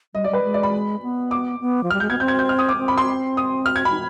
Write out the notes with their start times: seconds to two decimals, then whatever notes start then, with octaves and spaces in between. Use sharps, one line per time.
0.14 G3 D#5
0.24 D5
0.30 G3 B4
0.43 G#3
0.54 D5
0.63 B5
1.03 B3
1.31 D6
1.61 B3
1.84 F3
1.90 G3 F6
2.00 G#3 G6
2.10 B3 G#6
2.20 C4 G6
2.28 G#6
2.39 G6
2.49 F6
2.59 D#6
2.69 D6
2.78 C4
2.88 B5
2.98 C6
3.37 D#6
3.66 F6
3.76 G#6
3.85 B5
3.91 D#4